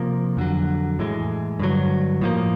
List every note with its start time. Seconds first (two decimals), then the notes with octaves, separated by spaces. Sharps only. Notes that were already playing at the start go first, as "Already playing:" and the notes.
Already playing: C3 F3 A#3
0.37 F2 D3 F#3
0.99 A2 E3 G#3
1.60 G2 D3 F#3
2.21 A2 F3 A#3